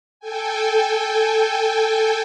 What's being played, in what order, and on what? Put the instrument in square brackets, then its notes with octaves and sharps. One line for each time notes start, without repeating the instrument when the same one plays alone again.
[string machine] A4 G5 G#5